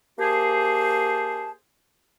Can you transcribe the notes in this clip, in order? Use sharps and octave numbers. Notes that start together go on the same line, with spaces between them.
A#3 G4 G#4 C5 A5